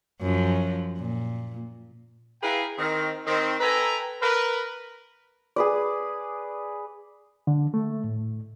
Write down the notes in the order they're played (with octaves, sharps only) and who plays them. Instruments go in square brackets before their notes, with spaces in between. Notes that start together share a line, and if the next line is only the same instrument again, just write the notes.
[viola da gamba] F#2 F3
A#2
[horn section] E4 G#4 B4 F5 G5 A#5
D#3 C4
D#3 C4
A4 B4 G5 G#5 A#5
A#4 B4
[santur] G#4 B4 D5
[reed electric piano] D3
A3
A2